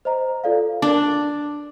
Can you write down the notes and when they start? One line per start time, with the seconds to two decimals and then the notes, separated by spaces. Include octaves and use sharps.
0.05 C5 D#5 A#5
0.44 F4 A4 D5 F5
0.82 D4 A#4 D5 A5 D6